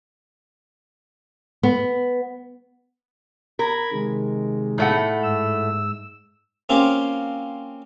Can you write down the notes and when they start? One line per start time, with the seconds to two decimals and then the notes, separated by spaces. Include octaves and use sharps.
1.63 B3
3.59 A#4 B5 G#6
3.92 C3 D#3 G#3
4.78 A2 A3 F#5
5.23 G#2 E6
6.69 A#3 C4 C#4 F4 G4